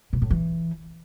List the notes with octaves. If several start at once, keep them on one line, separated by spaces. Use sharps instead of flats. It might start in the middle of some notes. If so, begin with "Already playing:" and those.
B2
A2
E3